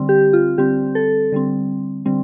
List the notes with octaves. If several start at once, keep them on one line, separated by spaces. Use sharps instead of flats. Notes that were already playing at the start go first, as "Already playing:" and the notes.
Already playing: D3 G3 C4
G4
F4
D3 G3 C4 G4
A4
D3 G3 C4
D3 G3 C4